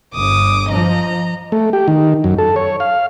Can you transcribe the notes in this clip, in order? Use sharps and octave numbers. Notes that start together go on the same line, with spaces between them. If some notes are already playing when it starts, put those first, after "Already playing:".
G1 D6 D#6
F3 D#5 A#5
A3
G4
D#3
F#2
A4
C#5
F5